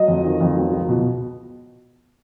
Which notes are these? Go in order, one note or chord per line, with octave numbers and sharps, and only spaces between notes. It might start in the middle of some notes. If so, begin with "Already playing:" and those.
Already playing: F#3 D#5
F2
D#3
F2
F#3
C#2
B2